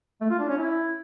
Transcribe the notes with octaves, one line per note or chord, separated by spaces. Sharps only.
A3
F4
D4
C#4
E4